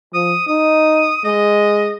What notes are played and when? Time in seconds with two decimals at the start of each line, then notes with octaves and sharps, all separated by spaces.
0.14 F3 D#6
0.47 D#4 D#6
1.24 G#3 D#5